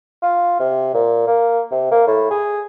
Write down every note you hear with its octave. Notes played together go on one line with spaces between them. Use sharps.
F4
C3
A#2
A#3
C3
A#3
A2
G#4